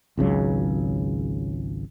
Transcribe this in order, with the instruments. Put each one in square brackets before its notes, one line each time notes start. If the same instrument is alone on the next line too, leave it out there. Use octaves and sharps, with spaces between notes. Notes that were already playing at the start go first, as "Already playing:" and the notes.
[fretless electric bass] G#1 C#2 C#3 F#3